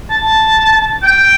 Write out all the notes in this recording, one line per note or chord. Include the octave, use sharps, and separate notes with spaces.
A5
G5